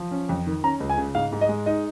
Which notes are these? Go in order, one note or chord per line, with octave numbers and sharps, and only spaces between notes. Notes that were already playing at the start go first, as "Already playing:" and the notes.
Already playing: F3
C#4
F2
D#3
C#4 A#5
C#2
G#5
C#3
G#2 F5
G#2
D#5
G#3
D#4 D#5